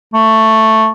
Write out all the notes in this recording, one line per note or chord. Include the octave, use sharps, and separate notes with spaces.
A3